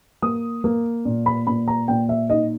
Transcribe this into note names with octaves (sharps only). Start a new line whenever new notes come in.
A#3 D#6
A#3
A#2
B5
A#2 B5
A#5
A#2 G5
E5
D#4 D#5